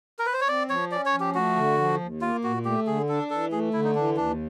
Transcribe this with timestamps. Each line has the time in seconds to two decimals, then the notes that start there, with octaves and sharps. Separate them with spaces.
0.19 A#4
0.26 B4
0.33 C5
0.41 C#5
0.48 C4 D5
0.70 F3 C#5
0.91 C#4 D5
1.06 C#5
1.13 F3
1.20 G4
1.35 A3 F#4
1.56 D3
1.78 F3
2.00 D#2
2.21 A#3 F4
2.43 A#2 F#4
2.65 A3 G4
2.87 D3 G#4
3.09 D4 A4
3.30 E3 A4
3.52 A3 G#4
3.73 D3 E4
3.84 D#4
3.95 E3 D4
4.16 D#2 D4